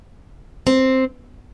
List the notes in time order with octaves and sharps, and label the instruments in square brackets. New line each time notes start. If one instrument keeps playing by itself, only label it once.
[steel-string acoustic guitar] C4